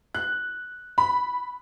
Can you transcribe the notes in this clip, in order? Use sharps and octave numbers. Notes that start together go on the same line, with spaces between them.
F#6
B5